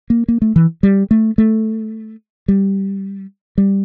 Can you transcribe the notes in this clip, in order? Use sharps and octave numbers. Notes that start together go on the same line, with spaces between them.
A#3
A#3
A3
E3
G3
A3
A3
G3
G3